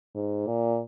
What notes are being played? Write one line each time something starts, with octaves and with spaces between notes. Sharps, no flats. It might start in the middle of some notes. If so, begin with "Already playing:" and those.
G#2
A#2